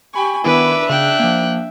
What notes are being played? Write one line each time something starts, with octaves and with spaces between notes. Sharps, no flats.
G4 G5 G#5 B5 C#6
D#3 B3 D4 E4 B4 E5 D6
C#3 G5 F#6
F3 A#3